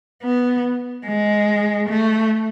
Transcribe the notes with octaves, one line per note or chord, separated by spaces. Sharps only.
B3
G#3
A3